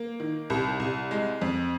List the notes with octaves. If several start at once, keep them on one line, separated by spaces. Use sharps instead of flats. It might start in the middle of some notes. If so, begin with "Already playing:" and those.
Already playing: A#3
D#3
C2
C2
G#3
F2